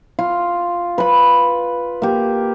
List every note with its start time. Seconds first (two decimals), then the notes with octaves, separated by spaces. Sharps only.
0.19 F4
0.98 B4 B5
2.02 A#3 G4